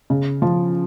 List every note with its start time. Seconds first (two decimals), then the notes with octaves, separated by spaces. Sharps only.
0.10 C#3
0.42 F3